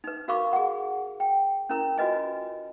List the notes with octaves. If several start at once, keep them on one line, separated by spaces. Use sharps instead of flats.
D#4 B4
F#4 A#4 F5 B5 C#6 D6
G#4 F#5
G5
C#4 E4 A#4 A#5
F4 F#4 B4 D#5 G#5